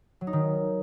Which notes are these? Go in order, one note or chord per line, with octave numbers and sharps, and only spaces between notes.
F#3
D#4
D#3